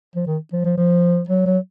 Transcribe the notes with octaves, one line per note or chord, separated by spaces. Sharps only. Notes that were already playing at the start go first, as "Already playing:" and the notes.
F3
D#3
F3
F3
F3
F#3
F#3